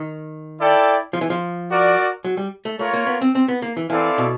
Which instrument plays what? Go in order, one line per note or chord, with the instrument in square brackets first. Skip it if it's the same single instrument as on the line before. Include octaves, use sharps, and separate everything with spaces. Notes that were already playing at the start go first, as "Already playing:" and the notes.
Already playing: [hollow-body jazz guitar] D#3
[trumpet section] E4 A4 D5 G5
[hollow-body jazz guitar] F3
E3
F3
[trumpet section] F#4 A#4 D5
[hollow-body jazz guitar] F#3
G3
A3
[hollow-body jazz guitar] A3 [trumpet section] F4 A#4 C#5
[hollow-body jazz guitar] A#3
B3
C4
C4
B3
A#3
E3
[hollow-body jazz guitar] E3 [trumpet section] C4 E4 A4 D5 F5
[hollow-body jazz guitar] B2